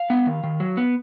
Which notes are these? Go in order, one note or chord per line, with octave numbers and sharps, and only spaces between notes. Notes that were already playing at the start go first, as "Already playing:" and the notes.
Already playing: F5
B3
D#3
D#3
F#3
B3